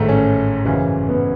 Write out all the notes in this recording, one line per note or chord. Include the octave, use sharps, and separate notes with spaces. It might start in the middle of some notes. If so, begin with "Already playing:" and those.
Already playing: A1 G#2 D#3 A3
C#4
G#1 F#2 C#3 E3
B3